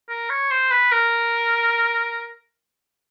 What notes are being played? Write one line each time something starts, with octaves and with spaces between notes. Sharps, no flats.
A#4
C#5
C5
B4
A#4